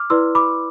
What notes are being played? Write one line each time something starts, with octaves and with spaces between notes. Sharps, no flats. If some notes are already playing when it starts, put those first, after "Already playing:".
Already playing: D6 F6
E4 B4 D5 C6 E6
B5 D6